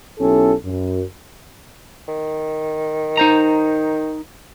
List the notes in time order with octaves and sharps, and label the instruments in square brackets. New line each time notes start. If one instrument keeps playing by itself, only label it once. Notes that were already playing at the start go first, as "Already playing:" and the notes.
[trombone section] B1 C#4 E4 G4 A4
F#2
[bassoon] D#3
[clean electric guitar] D#4 C5 A#5